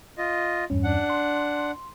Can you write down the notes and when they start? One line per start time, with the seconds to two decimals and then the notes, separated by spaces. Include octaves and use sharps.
0.18 F4 D#5
0.70 E2 G2 C#4
0.84 D4 F#5
1.10 C6